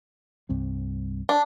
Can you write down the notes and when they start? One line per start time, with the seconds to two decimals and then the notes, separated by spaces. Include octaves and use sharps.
0.49 C2 G2 C4
1.29 D4